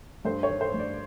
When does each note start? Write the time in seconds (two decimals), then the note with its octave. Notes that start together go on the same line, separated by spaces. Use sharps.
0.25 G2 C5
0.43 C#5
0.49 D#3
0.61 C5
0.74 G2
0.79 D5